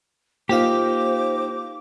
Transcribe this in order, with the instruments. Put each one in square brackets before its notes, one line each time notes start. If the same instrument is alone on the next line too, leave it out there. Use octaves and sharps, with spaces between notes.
[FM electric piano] A#3 F4 F5 [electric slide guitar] D#4 G4 [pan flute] C5 [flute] D6